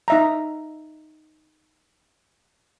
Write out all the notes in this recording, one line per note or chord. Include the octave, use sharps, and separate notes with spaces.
D#4 E5 A#5